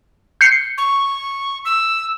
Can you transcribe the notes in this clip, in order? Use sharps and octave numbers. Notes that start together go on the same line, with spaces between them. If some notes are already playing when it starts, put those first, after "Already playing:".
G6 C7 C#7
C#6
E6